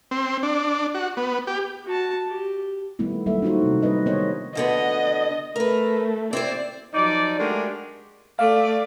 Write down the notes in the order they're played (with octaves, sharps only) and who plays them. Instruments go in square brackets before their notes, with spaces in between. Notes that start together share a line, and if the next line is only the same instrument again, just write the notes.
[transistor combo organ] C4
D4
F#4
B3
G4
[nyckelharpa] F#4 A5
G4
[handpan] D#3 G3 A3 B3 E4
F#3 G3 A#3 A4 E5
D4 D#4 F4 F#4 C5
C3 C4
G3 D4 B4 D#5
D#3 B3 C5 C#5 D#5
[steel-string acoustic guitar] D2 D3 B3 [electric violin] D#5
[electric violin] A3 [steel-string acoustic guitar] A#4 B4
[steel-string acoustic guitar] C4 E4 C5 [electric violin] D5
[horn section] F3 F#3 D#4 D5
G#3 A3 D4 F#4 G4 A#4
[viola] A3 D5 [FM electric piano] F5